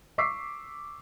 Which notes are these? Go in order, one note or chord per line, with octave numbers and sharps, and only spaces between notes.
C#6 D6 E6 B6 C7